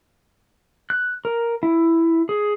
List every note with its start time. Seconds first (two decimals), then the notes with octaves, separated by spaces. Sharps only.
0.90 F#6
1.25 A#4
1.63 E4
2.29 G#4